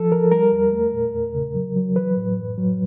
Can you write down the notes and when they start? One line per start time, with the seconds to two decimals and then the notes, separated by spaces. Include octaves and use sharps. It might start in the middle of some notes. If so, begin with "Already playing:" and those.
Already playing: F3 A4
0.12 F3 A#4
0.32 G3 A#4
0.52 E2
0.73 A3
0.93 A#2
1.15 E2
1.34 C#3
1.55 F#3
1.76 F#3
1.96 E3 B4
2.17 A2
2.37 F#2
2.58 F#3